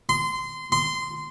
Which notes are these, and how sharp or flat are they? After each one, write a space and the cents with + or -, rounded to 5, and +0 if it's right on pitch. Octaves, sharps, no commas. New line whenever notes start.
C6 -20
C6 -15